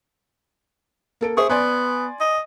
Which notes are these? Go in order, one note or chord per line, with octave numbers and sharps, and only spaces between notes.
A#3 A4 D7
G#4 C5 E5 C#6
B3 D5 G#5 C6
D#5